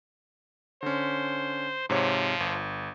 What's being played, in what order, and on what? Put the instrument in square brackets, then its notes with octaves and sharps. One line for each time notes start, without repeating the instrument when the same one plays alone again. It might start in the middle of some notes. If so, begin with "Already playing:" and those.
[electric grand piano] D3 C#4 [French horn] C5
[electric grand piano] G#2 C3 C#5 [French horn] F3
[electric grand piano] G1